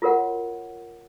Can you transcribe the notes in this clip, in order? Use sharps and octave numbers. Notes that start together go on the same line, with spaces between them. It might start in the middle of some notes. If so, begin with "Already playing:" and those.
F4 F#4 A#4 C#5 F#5